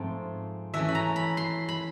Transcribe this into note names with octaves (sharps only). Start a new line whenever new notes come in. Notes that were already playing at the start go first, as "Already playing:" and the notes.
Already playing: G#2 F3 A3 C4 F4
E3 A3 C#4 E5
B5
A#5
B5
C6
B5